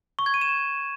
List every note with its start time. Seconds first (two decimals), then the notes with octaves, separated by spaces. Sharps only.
0.19 C#6
0.26 G#6
0.34 D#7
0.41 E7